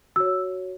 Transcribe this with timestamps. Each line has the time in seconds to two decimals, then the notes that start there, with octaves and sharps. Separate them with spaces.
0.16 F#4 C#5 E6